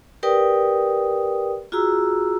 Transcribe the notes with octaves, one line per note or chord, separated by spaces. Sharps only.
G4 A#4 B4 D5 G5 D#6
F4 F#4 G#4 A#5 E6